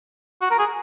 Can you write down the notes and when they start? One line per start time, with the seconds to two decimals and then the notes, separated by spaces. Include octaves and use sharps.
0.41 F#4
0.51 A#4
0.59 G#4